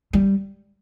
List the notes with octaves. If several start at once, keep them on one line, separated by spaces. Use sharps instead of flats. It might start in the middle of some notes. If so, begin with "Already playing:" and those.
G3